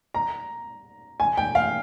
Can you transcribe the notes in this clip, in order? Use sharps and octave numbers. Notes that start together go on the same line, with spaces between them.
A#5
G#5
G5
F5